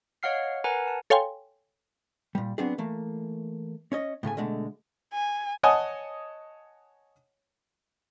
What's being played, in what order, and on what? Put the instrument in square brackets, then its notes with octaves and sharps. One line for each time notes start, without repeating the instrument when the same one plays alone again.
[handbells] C#5 D#5 F5 F#5 F6 C7
A#4 B4 F#5 G#5 A#5
A5
[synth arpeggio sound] A4 C#5 F5 G5 G#5 C6
[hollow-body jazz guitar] A#2 G3
F#3 B3 C4 D4 G#4
E3 A3 A#3
C#4 C#5 D#5
A2 C#3 A3 G#5
B2 D3 G#3 A3
[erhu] G#5
[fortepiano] C#5 D#5 F#5 G#5 A5 D#6